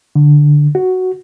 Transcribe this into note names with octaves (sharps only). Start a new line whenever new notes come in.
D3
F#4